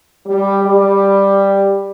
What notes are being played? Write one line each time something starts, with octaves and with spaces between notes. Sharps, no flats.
G3
G3